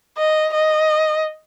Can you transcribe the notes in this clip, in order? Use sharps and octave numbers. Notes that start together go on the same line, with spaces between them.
D#5
D#5